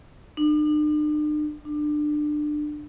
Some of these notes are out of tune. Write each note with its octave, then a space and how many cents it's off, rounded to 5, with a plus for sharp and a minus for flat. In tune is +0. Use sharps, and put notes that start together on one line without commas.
D4 +45
D4 +25